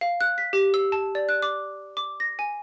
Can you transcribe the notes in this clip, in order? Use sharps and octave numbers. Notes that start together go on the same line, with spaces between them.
F5
F#6
B6
G4
E6
A5
D5
F#6
D6
D6
A#6
G#5